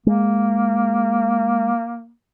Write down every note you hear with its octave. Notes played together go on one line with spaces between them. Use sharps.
G#3 A#3